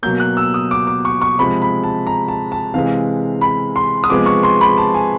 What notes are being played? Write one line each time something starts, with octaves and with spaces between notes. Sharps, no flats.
B2 F#3 A#3 G6
F#6
E6
D#6
D6
D6
C#6
C#6
C3 F3 G#3 B5
B5
A5
A#5
A5
A5
C3 E3 G#3 F5
B5
C6
D#6
C3 F3 G#3 B3 D6
C#6
C6
B5
A5
G#5